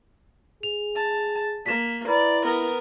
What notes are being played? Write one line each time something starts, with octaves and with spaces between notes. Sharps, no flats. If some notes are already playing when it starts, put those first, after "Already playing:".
G#4 F7
A5
A#3 B6 E7
E4 B4 D5 A#5 B5
B3 A#4